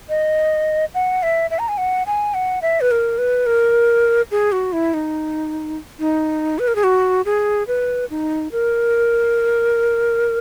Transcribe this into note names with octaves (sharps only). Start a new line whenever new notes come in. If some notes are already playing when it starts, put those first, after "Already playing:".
D#5
F#5
E5
E5
A#5
G#5
F#5
G#5
F#5
E5
B4
A#4
B4
A#4
G#4
F#4
E4
D#4
D#4
B4
A#4
G#4
F#4
G#4
B4
D#4
A#4